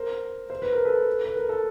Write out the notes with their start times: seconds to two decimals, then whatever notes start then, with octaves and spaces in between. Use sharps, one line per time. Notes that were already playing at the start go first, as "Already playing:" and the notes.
Already playing: A#4 C5
0.50 C5
0.62 B4
0.73 A#4
0.85 A4 B4
1.25 B4
1.36 A#4
1.49 A4